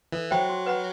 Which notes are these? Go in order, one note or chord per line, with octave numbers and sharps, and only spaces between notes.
E3 A4
F#3 C5 E5 G5 B5
F#4
B4 F#5 B5